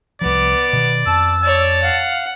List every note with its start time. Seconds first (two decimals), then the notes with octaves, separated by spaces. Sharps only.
0.21 C2 F3 B3 D5 D6
0.73 B2 D#3
1.06 F2 A5 E6
1.43 C#5 D5 A5
1.82 F5 F#5